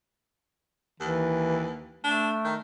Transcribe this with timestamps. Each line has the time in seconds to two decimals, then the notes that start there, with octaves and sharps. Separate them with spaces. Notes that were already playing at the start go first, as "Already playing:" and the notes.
1.00 D#2 E3
2.04 A3 D4
2.44 D#3